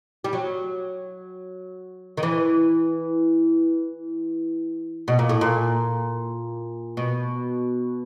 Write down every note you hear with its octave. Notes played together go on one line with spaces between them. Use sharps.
G3
F#3
D#3
E3
B2
A#2
A2
A#2
B2